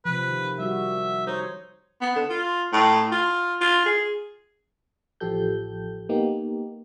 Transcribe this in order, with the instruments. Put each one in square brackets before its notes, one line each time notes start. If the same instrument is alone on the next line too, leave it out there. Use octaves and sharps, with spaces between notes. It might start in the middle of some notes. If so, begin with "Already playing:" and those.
[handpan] C3 F3 [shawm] B4
[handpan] D#3
[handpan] G3 F#4 [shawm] E5
[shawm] D#4 [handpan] C5 C#5
[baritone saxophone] B3
D3
F4
A2
F4
F4
G#4
[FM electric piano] A1 F3 G4 A4 G6
A#3 B3 D#4 G4